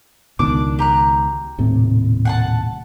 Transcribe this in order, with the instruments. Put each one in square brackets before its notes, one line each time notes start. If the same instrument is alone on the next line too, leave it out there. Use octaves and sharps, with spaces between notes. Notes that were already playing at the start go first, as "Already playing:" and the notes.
[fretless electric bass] C#2 B2 D#3 [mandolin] D4 D6
[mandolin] G4 A#5 F#6
[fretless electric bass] D#1 A2 C3
[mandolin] F#5 G#5 A5